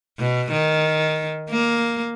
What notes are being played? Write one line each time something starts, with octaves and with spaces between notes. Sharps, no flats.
B2
D#3
A#3